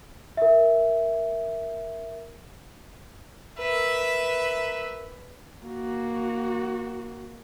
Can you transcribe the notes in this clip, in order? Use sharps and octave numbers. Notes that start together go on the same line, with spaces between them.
A#4 E5
A#4 B4 E5
A#3 F#4